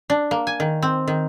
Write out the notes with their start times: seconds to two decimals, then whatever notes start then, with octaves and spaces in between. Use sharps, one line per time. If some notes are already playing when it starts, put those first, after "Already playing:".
0.10 D4
0.31 A#3
0.47 G#5
0.60 D#3
0.82 C4
1.07 D#3